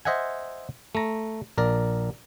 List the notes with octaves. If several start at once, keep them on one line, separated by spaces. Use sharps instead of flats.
C5 D#5 E5 F#5 G#5
A3 A#5
A#1 A#4 D5